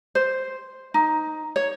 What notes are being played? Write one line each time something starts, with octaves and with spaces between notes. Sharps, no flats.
C5
D#4
C#5